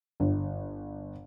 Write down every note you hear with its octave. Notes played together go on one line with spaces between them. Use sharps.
G1